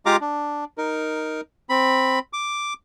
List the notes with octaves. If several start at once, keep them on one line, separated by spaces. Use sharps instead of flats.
G#3 F4 G4 F5 A#5 D6
D4
D#4 A#4
C4 B5
D6